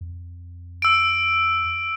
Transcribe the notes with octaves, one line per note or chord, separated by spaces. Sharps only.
F2
E6 D7